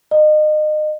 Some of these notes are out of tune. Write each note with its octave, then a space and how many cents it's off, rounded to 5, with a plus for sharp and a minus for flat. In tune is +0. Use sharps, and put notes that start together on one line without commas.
D#5 -30